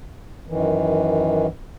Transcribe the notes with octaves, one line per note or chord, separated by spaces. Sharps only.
F#2 D#3 E3